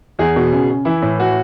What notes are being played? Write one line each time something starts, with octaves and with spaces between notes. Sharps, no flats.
E2 G#4
B2
C#3
C#3
E3 E4
A2
E3 F#4